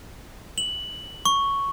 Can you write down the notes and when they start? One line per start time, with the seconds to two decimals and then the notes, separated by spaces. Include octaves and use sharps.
0.58 F#7
1.25 C#6